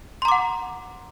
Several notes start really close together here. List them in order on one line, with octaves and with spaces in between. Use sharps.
C6 A#5 D6 F#5